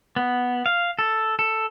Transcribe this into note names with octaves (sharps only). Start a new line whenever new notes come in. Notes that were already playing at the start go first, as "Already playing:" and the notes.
B3
F5
A4
A4